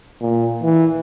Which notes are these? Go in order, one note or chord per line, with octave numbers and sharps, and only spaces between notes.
A#2
E3